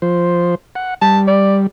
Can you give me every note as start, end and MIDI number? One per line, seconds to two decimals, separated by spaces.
0.02 0.55 53
0.02 0.55 72
0.75 0.94 78
1.02 1.67 55
1.02 1.20 81
1.27 1.58 74